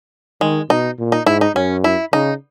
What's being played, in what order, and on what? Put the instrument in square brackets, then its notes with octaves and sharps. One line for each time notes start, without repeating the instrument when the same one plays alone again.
[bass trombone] D#3 [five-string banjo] G#3
[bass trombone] B2 [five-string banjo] D#4
[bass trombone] A#2
[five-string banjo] D#4
[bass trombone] G#2 [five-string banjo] E4
[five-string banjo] D#4
[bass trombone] F#2 [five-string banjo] C#4
[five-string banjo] E4
[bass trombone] C#3 [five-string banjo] D#4